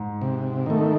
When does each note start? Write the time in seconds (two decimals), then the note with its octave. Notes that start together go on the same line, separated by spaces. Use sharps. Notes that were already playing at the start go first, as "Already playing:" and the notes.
Already playing: G#2
0.21 C3
0.66 D#3 A3